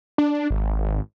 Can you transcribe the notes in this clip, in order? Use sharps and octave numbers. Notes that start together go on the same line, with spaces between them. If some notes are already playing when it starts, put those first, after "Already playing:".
D4
G#1